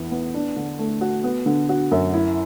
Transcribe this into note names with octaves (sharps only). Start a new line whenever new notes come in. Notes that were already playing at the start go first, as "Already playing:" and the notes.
Already playing: E2 B3 E4
B3
D4
D3
A3
F#4
B3
D3
F#4
F#2
E4